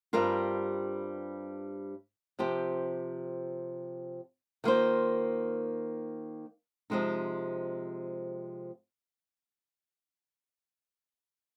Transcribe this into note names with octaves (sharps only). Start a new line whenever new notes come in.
G2 G3 C4 F4 A#4
C3 F3 C4 G4 C5
D#3 A#3 F4 C5
C3 F3 G#3 C4 D#4